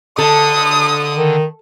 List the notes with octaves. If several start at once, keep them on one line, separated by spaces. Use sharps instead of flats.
D3 A4 D#6
D#3